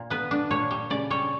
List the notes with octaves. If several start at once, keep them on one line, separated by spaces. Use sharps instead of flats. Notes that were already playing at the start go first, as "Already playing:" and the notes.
Already playing: A#2
B3 B4
D4
A#2 C#5
G3
C#3 D5
G3 C#5